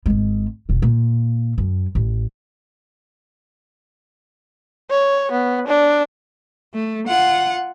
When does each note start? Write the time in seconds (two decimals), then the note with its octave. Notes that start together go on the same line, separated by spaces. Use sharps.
0.06 G#1 G#3
0.69 E1 B2
0.82 A#2
1.58 F#2
1.95 A1
4.90 C#5
5.32 B3
5.68 D4
6.74 A3
7.08 F4 F#5